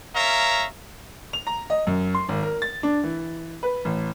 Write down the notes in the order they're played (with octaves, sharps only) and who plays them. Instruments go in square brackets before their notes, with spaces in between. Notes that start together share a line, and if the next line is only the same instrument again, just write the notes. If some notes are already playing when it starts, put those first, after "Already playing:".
[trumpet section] A#4 C#5 E5 F5 A#5
[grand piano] F7
A#5
D#5
F#2
C6
G#1
A#4
A6
D4
E3
B4
A1